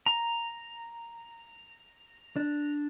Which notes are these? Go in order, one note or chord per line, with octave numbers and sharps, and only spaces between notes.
A#5
D4